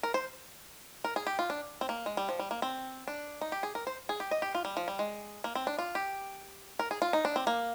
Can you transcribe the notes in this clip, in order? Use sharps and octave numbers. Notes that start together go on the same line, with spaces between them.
A#4
C5
A#4
G#4
G4
F4
D4
C4
A#3
G#3
G3
F3
G3
A#3
C4
D4
D#4
G4
G#4
A#4
C5
G#4
G4
D#5
G4
F4
G3
F3
G3
G#3
A#3
C4
D4
F4
G4
A#4
G#4
F4
D#4
D4
C4
A#3